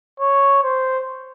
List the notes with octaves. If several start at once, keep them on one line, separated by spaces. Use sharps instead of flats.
C#5
C5